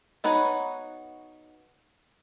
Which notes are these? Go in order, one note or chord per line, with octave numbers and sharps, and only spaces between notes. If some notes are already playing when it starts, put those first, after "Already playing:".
B3 D#4 F#4 B4 C#5